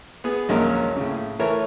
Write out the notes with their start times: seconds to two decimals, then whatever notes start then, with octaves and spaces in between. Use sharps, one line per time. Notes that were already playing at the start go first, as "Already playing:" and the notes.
0.24 B3 G#4
0.49 A#1 D#2 F#3 G#3 C#4 A#4
0.97 A2 C#3
1.39 E3 A3 A#4 C#5